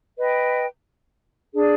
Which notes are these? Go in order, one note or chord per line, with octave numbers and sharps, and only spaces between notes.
B4 D#5 G5
D4 G#4 D5